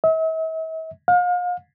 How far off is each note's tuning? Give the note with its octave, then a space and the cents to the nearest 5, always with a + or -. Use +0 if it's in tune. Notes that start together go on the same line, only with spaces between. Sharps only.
E5 -45
F5 +40